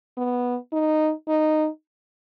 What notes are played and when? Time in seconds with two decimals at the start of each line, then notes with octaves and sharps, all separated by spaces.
0.17 B3
0.73 D#4
1.28 D#4